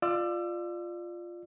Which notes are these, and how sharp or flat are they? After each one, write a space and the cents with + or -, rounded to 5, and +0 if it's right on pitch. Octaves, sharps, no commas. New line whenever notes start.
F4 +0 D5 +25 E6 +30